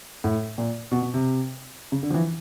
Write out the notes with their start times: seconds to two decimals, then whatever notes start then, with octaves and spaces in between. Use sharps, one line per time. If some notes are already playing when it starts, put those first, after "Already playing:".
0.24 A2
0.58 A#2
0.92 B2
1.02 B2
1.14 C3
1.92 C#3
2.03 D3
2.10 F3
2.14 E3